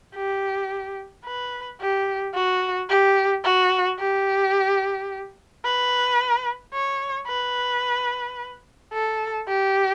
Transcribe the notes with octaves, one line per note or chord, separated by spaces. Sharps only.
G4
B4
G4
F#4
G4
F#4
G4
B4
C#5
B4
A4
G4